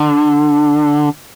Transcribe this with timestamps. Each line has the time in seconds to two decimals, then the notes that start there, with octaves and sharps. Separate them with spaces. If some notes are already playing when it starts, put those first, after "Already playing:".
Already playing: D3